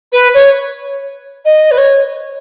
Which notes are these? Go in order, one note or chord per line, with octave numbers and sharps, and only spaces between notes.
B4
C#5
D#5
B4
C#5